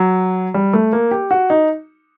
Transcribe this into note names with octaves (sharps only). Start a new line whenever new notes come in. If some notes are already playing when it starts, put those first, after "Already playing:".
Already playing: F#3
G3
A3
A#3
G4
F#4
D#4